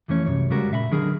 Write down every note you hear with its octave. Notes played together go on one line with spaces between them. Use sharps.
F2 E3 A3 C#4 C#5
C2 F#2 C#5
C#3 G3 G#3 F#4 A#4
A#2 E5 F5 B5
D3 D#3 F#3 D4 G#4 A#4